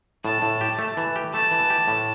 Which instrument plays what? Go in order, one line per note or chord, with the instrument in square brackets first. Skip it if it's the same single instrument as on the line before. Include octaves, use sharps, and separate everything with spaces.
[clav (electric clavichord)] A2 [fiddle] A5
[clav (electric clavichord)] A2
G4
A3
E3
G4
[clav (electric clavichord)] A3 [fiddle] A5
[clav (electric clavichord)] E3
G4
A2